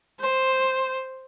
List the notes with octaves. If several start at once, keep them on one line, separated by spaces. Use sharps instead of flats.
C5